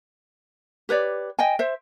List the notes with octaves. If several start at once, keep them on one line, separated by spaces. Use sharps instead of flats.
G4 B4 C#5 D5
D#5 G5 G#5
C5 E5